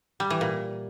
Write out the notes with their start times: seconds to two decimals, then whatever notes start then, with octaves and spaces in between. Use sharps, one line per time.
0.20 G3
0.30 E3
0.41 A#2